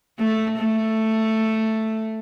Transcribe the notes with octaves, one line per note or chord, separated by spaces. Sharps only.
A3
A3